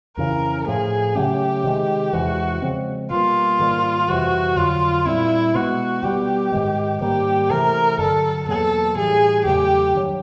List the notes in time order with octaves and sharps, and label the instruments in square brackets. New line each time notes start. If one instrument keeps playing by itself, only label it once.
[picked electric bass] F2 C#3 E3 [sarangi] A#4
[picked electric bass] A2 F3 A3 [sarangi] G#4
[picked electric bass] C#3 F#3 A3 C#4 [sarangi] G4
[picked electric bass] C3 D#3 G#3
[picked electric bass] E2 C3 E3 G#3 [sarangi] F#4
[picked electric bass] C#3 F3 G#3 C4
[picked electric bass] B2 G3 A#3 [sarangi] F4
[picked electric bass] G#2 D#3 G3 A#3
[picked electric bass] F2 C3 E3 G3 [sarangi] F#4
[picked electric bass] F2 D3 F#3 [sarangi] F4
[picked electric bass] A#2 G3 C4 [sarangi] E4
[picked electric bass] B2 G#3 B3 [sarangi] F#4
[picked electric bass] B2 G3 B3 [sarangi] G4
[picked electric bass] G#2 D#3 G#3
[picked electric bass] G#2 D#3 G3 A#3 [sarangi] G4
[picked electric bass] C3 E3 A3 [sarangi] A#4
[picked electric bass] G2 D3 F#3 [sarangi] A4
[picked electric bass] E2 B2 F#3 A#3 [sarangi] A4
[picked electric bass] A2 E3 G3 [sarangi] G#4
[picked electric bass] E2 C#3 F#3 A3 [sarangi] G4
[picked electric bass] G2 D#3 F#3